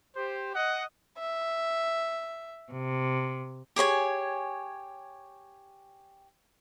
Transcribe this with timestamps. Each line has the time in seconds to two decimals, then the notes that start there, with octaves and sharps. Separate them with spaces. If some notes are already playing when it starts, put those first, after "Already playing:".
0.16 G4 C5
0.55 D#5 F#5
1.20 E5
2.71 C3
3.76 G4 G#4 C#5 G#5